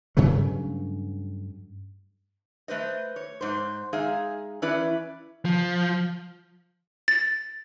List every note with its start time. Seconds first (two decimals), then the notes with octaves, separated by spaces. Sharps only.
0.17 G2 C#3 F#3 A3
2.68 A3 B4 C5 D#5
3.16 C#5
3.41 G#2 C5
3.93 G#3 D#4 G#4 E5 F5
4.62 E3 C#4 E4 B4 D5
5.45 F3
7.08 A6